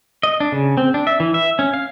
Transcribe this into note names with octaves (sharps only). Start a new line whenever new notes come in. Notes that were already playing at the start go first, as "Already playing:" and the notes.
D#5
D4
C#3
C4
D4
E5
E3
E5
C#4
F5